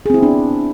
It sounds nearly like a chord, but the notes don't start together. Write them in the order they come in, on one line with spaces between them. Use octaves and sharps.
G#4 C4 E4 B3 D4